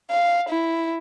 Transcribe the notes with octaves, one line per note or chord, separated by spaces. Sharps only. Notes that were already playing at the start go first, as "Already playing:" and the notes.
F5
E4